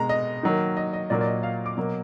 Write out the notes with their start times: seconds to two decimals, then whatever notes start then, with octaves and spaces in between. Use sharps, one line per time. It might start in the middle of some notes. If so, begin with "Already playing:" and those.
Already playing: B2 G#3 A#5
0.09 D#5
0.43 D#3 F#3 A#3
0.77 D#5
0.93 D#5
1.10 A#2 F#3 A#3 D5
1.21 D5
1.27 D#5
1.43 F5
1.66 D6
1.77 B2 F#3 A#3